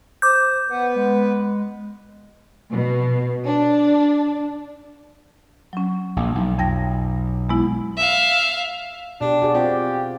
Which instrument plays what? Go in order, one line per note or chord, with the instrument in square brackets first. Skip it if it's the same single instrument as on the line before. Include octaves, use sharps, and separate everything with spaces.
[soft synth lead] C5 [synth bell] D6 G6
[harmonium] B3 B4 [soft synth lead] F#5
[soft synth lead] G#3
[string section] B2
D4
[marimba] F#3 C#4
[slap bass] A#1
B1
[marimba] F2 G5 A#6
G#3 B3 E4
[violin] E5 F5
[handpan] B2 G4 [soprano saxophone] D4
[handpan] F#4 G#4 D5
[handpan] C4 F4 D5 [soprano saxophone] G4